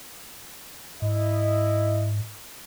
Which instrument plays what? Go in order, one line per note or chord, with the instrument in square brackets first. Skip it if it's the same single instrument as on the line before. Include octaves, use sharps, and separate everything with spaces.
[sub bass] G#2 [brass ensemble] E4 D#5